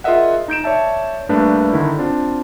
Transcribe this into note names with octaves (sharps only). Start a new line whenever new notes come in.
F4 G#4 A#4 D#5 E5 F#5
D#4 G6 D7 E7
C#5 D5 E5 A5
G2 A3 A#3 D4 B4
D3 D#3 E4
C4 D4 F4